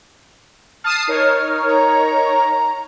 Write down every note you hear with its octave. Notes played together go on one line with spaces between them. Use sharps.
A5 D#6 F6 C7
D#4 A#4 C#5
A#5